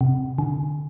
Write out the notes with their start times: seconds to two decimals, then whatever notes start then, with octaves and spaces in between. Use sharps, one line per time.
0.01 C3
0.38 D3